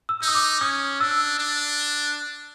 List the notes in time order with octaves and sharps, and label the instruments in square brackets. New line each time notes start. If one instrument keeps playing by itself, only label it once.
[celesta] E6
[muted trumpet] D#4 [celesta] E6
[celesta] D#6
D6
[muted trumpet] C#4 [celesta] D#6
[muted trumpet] D4 [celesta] E6
[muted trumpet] D4